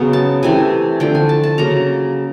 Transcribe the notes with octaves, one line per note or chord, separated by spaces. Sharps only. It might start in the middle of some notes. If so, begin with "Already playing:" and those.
Already playing: C#3 F#3 B3
A5
C3 E3 A3 G#5
D3 F3 A3 G5
G#5
A5
A5
C#3 F#3 A#3 A#5